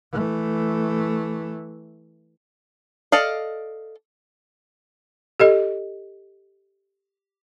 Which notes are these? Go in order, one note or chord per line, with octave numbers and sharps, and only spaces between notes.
E3 A3
A4 D5 D#5 F5
G4 A4 D#5